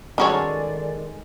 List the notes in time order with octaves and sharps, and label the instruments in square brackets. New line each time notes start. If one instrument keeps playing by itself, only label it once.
[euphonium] D#3 [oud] G#3 D#4 A4 [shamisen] C#4 F#4 C#5 [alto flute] D5